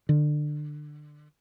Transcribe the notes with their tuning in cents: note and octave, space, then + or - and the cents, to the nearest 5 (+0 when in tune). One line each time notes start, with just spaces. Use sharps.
D3 +25